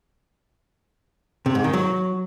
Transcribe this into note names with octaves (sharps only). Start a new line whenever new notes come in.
C3
G#2
D#3
F#3